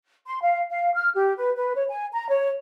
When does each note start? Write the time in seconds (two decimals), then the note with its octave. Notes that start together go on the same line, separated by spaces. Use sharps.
0.27 C6
0.42 F5
0.70 F5
0.94 F6
1.14 G4
1.36 B4
1.55 B4
1.74 C#5
1.89 G#5
2.13 A#5
2.29 C#5